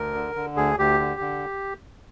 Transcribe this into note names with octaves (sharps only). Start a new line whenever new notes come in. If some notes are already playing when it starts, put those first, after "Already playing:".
Already playing: D2 A#4
D3
D3
D2 G#4
D2 G4
D3
D3